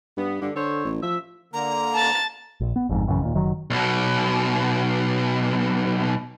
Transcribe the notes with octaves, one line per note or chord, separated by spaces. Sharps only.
G2 B3
G2 D3
D3 A4 C5 C#5
A1
F3 E5
D3 A#3 A#5
A5 A6
A#1
B3
G1 F2 G#2
A1 F#2 C#3
D#2 A#2
F#1 D#3 F#3
B1 B2